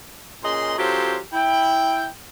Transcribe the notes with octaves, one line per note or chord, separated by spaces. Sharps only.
A#2 C#4 G#4 D#5 C6
F#3 C#4 F4 G4 A4 C5
E4 G5